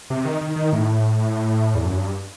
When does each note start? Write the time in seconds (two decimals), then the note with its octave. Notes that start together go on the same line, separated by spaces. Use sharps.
0.10 C3
0.25 D#3
0.41 D#3
0.56 D#3
0.73 A2
1.75 E2
1.85 F#2
1.97 G2